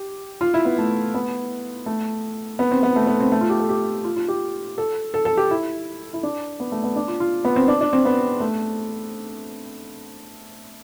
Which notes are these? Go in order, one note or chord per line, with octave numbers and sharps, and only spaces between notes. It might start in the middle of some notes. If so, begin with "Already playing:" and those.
Already playing: G4
F4
E4
B3
A3
B3
A3
B3
C4
B3
A3
B3
C4
A3
F4
G4
A4
G4
F4
F4
G4
A4
A4
A4
G4
E4
E4
D4
B3
A3
B3
D4
F4
F4
B3
C4
D4
D4
C4
B3
A3